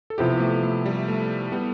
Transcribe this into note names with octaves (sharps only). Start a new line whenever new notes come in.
A4
C3 F3 B3 E4 G4
A3
A3
G3
A3
G3 B3